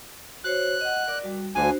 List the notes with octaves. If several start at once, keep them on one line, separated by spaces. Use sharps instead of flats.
F#4 C5 C#5 F#6
D#5 F#5
A#4 D5 D6
G3 F#4
D2 D4 F#4 C5 G#5